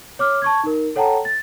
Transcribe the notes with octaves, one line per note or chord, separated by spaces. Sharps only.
C#5 D6 F6
A5 C#6 G#6
D#4 A#4
A4 C#5 F#5 G5 A5 A#5
A6